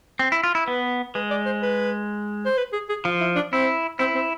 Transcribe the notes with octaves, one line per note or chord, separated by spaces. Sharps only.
C4
E4
F4
E4
B3 B4
G#3 B4
D5
C5
B4
C5
B4
G#4
G#4
F3 F4
E4
D4
C4 E4
C4 E4
C4